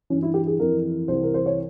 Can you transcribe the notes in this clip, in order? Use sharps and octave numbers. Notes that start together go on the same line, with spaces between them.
G2 E3 C#4
E4
G4
G#4
F2 E3 A#4
C2 C3 E3 C5
A#4
C5
C#5